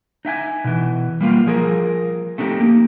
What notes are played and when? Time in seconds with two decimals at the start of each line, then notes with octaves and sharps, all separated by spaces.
0.25 D#4 E5 G5 G#5
0.64 B2 E3
1.21 G3 A#3 F4
1.47 F3 G#4 A#4
2.38 A3 C4 D#4 F#4 G4
2.60 A#3